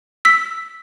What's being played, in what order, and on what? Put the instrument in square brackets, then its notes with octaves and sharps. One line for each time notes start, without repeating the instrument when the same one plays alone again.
[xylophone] E6 B6